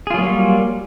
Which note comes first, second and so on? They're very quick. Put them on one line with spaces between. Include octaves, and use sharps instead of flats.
G#4 F4 F#3 A#3 G3